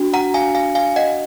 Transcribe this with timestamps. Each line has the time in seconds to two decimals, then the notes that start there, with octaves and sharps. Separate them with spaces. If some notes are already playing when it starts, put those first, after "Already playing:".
Already playing: D4 F#4
0.14 F#5 A#5
0.34 F5 G#5
0.55 F5 G#5
0.75 F5 G#5
0.96 D#5 F#5